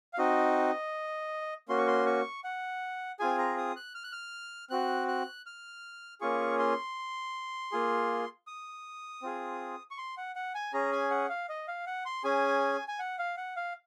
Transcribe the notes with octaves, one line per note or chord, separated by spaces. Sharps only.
F5
C4 D#4 F#4 D#5
A#3 C#4 F#4 C6
C#6
C6
C#6
F#5
C4 F4 G#4 G#5
A#5
D#6
F#6
F6
F#6
F6
C4 F#4 F#6
F#6
F6
A#3 C#4 F4 G#4 C#6
C6
A#3 F4 G#4
D#6
C4 F4 G#4
C#6
C6
F#5
F#5
G#5
C#4 G#4 A#5
G#5
F#5
F5
D#5
F5
F#5
C6
C#4 G#4 G#5
G#5
F#5
F5
F#5
F5